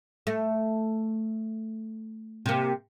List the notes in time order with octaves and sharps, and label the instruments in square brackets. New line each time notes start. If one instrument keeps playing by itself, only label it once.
[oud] A3
C3 A#3